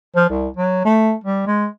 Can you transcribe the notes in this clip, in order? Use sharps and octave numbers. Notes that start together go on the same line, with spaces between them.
F3
C2
F#3
A3
G3
G#3